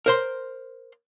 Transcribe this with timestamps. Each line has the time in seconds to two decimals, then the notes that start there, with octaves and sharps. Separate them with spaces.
0.06 A#4 C5 C6